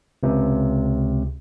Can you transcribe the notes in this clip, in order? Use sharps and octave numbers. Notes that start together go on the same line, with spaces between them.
C#2 C3